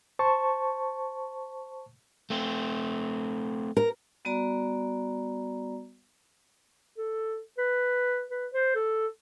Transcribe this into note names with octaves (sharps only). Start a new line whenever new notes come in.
C5 A5 C#6
A3 C4
A#4
G3 B3 F#4 D5 A#5
A4
B4
B4
C5
A4